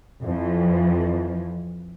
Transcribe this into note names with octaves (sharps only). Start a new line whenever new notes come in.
F2 E3 F3